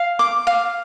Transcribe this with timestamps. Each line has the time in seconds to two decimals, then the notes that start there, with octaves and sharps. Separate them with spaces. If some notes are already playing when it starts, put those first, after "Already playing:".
Already playing: F5
0.19 D6
0.47 F5